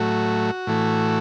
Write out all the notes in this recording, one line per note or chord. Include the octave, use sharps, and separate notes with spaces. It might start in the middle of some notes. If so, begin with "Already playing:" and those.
Already playing: A2 F#3 A3 F#4
A2 E3 A3